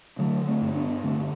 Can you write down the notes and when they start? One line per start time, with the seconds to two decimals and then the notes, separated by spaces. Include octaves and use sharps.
0.19 D3 F#3 A3
0.47 A3 C4
0.61 G2
0.75 B3 D4
1.04 D3 A3 C4